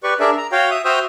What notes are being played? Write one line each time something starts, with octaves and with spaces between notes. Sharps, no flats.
G4 B4 D5 C#6
D4 G#4 A#4 D5 E5
A#5
F#4 C#5 F5 G5
E5 D#6
F#4 C5 E5 G5 D#6 F6